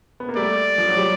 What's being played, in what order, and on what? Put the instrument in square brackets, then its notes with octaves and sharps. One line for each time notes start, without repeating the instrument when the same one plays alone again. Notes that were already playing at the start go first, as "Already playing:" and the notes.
[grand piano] B3
A#3
[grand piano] G3 A3 [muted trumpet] D5
[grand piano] F3
F#3
G3